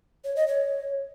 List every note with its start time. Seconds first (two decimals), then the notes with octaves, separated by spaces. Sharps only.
0.24 C#5
0.36 D#5
0.48 C#5